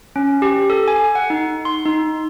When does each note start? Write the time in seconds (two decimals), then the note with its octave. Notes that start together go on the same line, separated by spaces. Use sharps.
0.16 C#4
0.42 G4
0.70 A4
0.88 G#5
1.15 F#5
1.30 D#4
1.65 C6
1.85 D#4